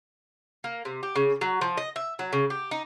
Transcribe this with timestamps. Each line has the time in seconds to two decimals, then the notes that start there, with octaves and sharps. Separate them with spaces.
0.64 A#3
0.85 C3
1.03 G4
1.15 C#3
1.41 F#3
1.61 F3
1.77 D#5
1.96 E5
2.19 F#3
2.33 C#3
2.50 G4
2.71 D#4